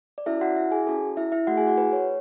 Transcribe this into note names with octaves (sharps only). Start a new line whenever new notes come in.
D5
C#4 E4 F#4 A4 E5
F#4 F#5
E4 E5
G#4 G#5
C#4 F#4 A4
E4 E5
E4 E5
A3 E4 F#4 G#4 F#5
G#4 G#5
F#4 F#5
B4
C#5